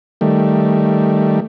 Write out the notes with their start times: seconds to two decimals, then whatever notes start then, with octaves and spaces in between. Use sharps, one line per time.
0.21 D#3 G3 A3